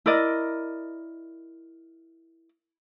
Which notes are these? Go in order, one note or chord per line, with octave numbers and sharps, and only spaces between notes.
E4 A#4 D5 D#5